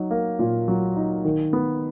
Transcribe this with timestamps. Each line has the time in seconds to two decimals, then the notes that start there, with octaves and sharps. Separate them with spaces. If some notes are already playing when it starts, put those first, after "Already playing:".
Already playing: F#3 D#4
0.11 A#3
0.39 A#2
0.68 F#3
0.96 D#4
1.25 D#3
1.53 B3